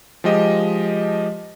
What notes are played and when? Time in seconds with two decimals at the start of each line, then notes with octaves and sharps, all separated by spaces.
0.24 F3 G#3 G4 D#5